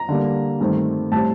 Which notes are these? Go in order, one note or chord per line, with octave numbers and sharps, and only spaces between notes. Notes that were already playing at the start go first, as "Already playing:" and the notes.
Already playing: A#5
D3 G3 A#3
G2 D#3 A3 C4
A2 G3 C4 A5